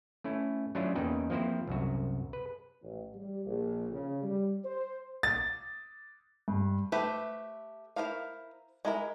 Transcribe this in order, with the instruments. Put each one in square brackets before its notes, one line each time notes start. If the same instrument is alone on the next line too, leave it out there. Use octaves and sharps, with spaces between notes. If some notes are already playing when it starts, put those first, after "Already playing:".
[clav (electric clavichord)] A3 C#4 E4
F#3 A3 C#4 D4 E4 F4
E2 A#3 C#4 D#4 B4 G5
F3 A#3 C4 E4 C5
C2 F#2 F#4
B4
[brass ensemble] A1
G3
A#1
C#3
G3
C5
[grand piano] A6
G2
[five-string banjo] A3 G4 B4 C5 E5
E4 F4 A#4 C5 F5
G#3 E4 A#4